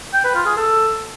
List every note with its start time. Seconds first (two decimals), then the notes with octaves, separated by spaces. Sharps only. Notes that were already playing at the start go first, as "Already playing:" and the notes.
0.13 G5
0.24 B4
0.35 F4
0.46 G#4
0.57 A4